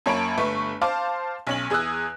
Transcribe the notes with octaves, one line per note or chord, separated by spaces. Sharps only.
F#2 A#3 C#5 A5 B5 D7
G1 A3 B4 C#6
C5 F5 A5 D6
B1 C#4 F#7
E2 G#4 D#6 E6 F#6